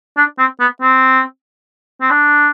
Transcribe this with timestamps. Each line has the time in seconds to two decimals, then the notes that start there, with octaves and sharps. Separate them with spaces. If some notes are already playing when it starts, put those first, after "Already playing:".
0.17 D4
0.38 C4
0.60 B3
0.82 C4
2.01 C4
2.10 D4